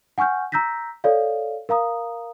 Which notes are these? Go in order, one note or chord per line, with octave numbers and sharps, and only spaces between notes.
F#5 G#5 C#6 F6 G6
A#5 E6 G6 A#6 B6
A4 C#5 D5 F5
A#4 F5 A#5 D#6